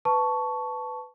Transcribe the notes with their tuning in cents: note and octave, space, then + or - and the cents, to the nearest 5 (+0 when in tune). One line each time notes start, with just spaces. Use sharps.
B4 +15 A5 +0 C#6 +10